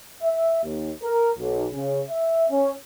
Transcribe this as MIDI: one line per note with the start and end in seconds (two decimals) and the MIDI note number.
0.22 0.61 76
0.64 0.91 39
1.03 1.31 70
1.38 1.66 35
1.73 2.03 49
2.09 2.45 76
2.50 2.71 61